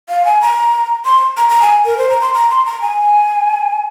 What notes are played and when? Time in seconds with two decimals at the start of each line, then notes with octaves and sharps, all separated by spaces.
0.09 F5
0.25 G#5
0.41 A#5
1.05 C6
1.37 A#5
1.49 A#5
1.62 G#5
1.85 A#4
1.98 C5
2.09 A#5
2.21 C6
2.33 A#5
2.50 C6
2.66 A#5
2.81 G#5